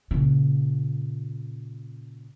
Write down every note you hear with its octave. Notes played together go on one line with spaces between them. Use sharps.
A#2 C#3